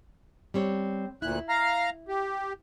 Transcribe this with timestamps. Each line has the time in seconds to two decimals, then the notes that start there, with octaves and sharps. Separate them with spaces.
0.54 G3 C4 C#5
1.22 D2 A#2 E4 F#6
1.49 F5 A#5 F6
2.08 G4